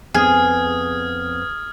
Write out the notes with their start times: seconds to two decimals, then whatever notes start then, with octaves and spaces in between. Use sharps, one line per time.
0.14 F2 B3 C4 G#4 D#6 F6 G#6